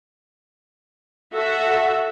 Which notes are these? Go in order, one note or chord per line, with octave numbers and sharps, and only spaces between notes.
F#4 A4 E5